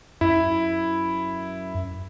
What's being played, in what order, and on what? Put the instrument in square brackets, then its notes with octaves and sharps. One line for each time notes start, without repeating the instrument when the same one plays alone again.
[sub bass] F#2 [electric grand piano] E4